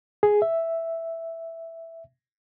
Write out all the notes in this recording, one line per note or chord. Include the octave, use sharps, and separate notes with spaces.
G#4
E5